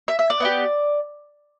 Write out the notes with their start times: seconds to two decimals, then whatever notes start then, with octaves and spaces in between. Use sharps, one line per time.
0.08 E5
0.19 E5
0.30 D5
0.40 B3 D#4
0.45 G4